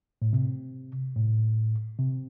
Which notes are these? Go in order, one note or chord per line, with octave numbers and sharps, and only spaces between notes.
A2
C3
A2
C3